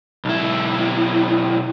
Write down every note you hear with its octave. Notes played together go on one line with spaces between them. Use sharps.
B1 E4